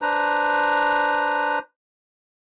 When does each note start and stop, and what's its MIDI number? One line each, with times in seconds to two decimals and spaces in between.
0.02 1.59 62
0.02 1.59 71
0.02 1.59 72
0.02 1.59 82